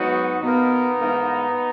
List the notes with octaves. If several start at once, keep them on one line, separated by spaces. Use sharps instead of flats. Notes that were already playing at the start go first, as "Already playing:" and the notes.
Already playing: G#2 F#3 B3 D#4 F#4
B2 A#3 B3 D#4
G#2 E3 A#3